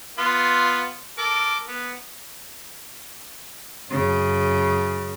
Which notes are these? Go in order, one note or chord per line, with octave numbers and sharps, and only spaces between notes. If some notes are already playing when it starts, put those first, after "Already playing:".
B3 F4 C6
A4 A#4 D6
B3
F#2 C#3